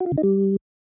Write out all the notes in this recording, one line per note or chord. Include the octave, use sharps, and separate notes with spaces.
F#4
F4
C#3
D#4
G3